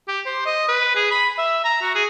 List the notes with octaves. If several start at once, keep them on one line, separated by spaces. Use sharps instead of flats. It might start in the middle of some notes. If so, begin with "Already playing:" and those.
G4
C5
D#5
B4
G#4
B5
E5
A#5
F#4
G#4